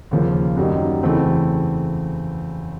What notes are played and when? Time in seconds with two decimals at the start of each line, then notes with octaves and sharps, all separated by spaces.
0.11 D#2 C#3 F3 A#3
0.57 F#2 D#3 G3 A#3 D#4
1.03 E2 C#3 E3 A3 C4